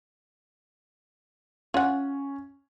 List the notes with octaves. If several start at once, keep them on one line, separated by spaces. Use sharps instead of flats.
C#4 F4 F#5